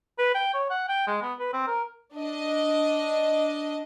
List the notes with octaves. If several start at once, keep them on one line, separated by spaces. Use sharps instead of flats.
B4
G5
C#5
F#5
G5
G#3
B3
B4
C4
A#4
D4 D#5